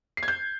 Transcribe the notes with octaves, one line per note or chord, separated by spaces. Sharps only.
C7
G#6
G6